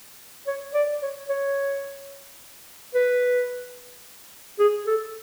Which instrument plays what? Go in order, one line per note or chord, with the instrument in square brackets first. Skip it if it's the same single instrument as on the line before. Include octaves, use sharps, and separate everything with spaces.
[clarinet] C#5
D5
C#5
C#5
B4
G#4
A4